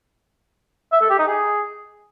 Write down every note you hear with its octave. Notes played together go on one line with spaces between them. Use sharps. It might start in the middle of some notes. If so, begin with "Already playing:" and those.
E5
A4
G4
D#4
G#4